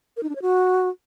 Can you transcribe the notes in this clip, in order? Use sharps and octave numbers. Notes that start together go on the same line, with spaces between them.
A#4
D#4
D4
C#5
F#4